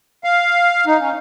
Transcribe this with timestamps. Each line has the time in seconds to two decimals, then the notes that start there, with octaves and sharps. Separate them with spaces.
0.24 F5
0.86 D#4
1.00 C#4